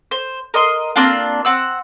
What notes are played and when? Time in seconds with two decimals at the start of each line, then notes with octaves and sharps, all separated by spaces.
0.11 C5
0.54 A#4 D#5 C6
0.96 A#3 C4 D4 F4
1.45 C4 F#5 E6